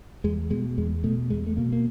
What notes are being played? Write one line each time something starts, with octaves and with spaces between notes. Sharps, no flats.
E2 G#3
B2 G#3
E2 G#3
B2 A3
E2 G#3
A3
B2 A#3
A#3